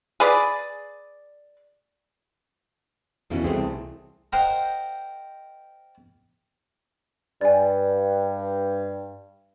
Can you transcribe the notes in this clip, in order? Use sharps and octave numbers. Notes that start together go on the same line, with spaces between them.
G#4 B4 D5
F2 B2 E3 C#4
C2 A3 C4 G#4
A#4 C5 D#5 F#5 G5
G2 D5 G#5